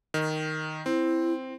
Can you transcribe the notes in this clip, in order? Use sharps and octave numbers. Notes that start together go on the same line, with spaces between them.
D#3
C4 E4